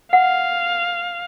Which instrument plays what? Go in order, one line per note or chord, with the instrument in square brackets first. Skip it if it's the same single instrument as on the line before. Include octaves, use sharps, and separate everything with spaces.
[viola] F5 [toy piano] F#5